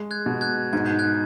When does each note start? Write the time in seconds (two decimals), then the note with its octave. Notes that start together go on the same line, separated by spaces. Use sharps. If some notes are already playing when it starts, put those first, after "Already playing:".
Already playing: G#3
0.11 F#6 G#6
0.26 B2
0.41 F#6 G#6
0.73 G#2 G#6
0.86 G6
0.99 F#6 G#6